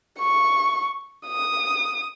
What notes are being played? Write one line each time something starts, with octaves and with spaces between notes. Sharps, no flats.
C#6
D#6